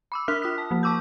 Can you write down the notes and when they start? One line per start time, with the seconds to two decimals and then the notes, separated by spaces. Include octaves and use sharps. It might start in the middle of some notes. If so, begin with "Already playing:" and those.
0.12 B5 D6 E6
0.28 D4 A#4 E5 F6 F#6 B6
0.42 F4 D#6 B6
0.58 A5
0.71 F3 A#3
0.83 A5 C#6 D6 E6 G6